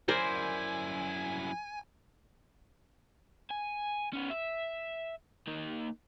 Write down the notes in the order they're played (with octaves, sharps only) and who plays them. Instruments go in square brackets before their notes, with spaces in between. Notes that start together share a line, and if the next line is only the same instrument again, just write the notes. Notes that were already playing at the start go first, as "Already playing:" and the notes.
[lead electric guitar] F#2 E4 [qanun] A#4 C5 D5 [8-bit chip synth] G#5
[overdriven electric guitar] G#5
B3 C#4
E5
A#3 D#4